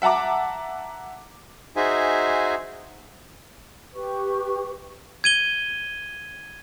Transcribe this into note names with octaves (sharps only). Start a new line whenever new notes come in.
E5 F#5 A5 A#5 D6
D#4 F#4 G#4 C5 E5 G#5
G4 B4 C#6
G#6 D#7 G7